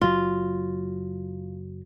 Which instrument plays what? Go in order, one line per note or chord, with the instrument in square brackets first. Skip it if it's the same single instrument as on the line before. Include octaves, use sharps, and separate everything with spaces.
[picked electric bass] F#1 F#3 [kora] F4